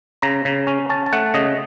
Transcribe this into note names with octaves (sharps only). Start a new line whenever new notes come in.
C#3 A#5
C#3
C#4
C#4 A5
A5
A3 F#5
C#3 D#5